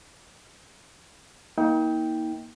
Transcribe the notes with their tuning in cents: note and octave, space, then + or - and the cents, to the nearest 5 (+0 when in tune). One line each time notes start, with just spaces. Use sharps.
A#3 +20 D#4 +40 G5 +0